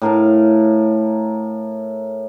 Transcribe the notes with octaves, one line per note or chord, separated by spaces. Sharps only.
A2 A#4 F5 A5